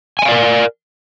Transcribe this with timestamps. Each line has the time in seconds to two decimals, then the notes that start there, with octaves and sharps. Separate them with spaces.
0.19 G#5
0.22 D#5
0.25 F5
0.29 D5
0.32 A#4